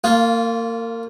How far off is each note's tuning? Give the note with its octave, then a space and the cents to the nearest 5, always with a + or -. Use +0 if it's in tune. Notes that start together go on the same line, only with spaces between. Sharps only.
A#3 -30 F4 +0